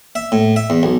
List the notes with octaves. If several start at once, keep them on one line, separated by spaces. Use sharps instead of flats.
E5
A2
E5
E2
B1